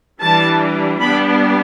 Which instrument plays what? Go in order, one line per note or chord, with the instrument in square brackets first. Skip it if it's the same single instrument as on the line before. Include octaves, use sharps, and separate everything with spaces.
[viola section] E3 G3 D4 A5
G3 B3 D4 B5